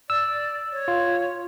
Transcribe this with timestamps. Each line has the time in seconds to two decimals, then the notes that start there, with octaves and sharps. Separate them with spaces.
0.10 D5 E6
0.72 C#5
0.88 F4